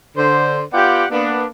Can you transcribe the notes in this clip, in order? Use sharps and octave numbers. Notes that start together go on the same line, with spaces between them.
D3 C5 C6
B3 F4 G4 D5 F#5 G5
A#3 B3 D4